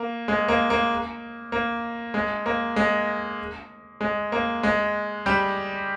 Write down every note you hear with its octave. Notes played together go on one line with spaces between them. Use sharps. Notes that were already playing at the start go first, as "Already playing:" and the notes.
Already playing: A#3
G#3
A#3
A#3
A#3
G#3
A#3
G#3
G#3
A#3
G#3
G3 G4